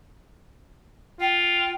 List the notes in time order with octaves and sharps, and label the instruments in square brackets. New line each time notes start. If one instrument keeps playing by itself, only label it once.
[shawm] F4 [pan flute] G5